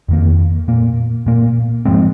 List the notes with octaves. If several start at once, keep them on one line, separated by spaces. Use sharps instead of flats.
F2 D#3 A#3
A#2 A#3
A#2 A#3
G#2 F3 G#3 C4